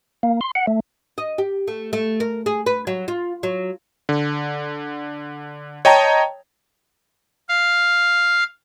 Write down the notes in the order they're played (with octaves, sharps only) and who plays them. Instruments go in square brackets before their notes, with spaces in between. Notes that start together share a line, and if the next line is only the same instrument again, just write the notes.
[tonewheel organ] A#3
C6
F#5
A3
[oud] D#5
G4
A3
A3
A#4
G#4
B4
F#3
F4
F#3
[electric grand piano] D3
C#5 D#5 G5 A5 A#5
[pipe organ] F5